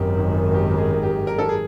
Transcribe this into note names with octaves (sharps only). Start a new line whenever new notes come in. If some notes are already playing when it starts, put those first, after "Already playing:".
Already playing: G#1 F#2 D#3 G4
G4
G#4
G4
A#4
A4
G#4